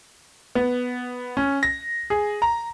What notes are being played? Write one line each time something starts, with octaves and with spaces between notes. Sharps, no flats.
B3
C#4
A#6
G#4
A#5